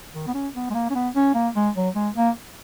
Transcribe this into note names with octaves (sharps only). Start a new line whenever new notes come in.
D#3
B3
C#4
B3
G#3
A#3
C#4
B3
C#4
A#3
G#3
F#3
G#3
A#3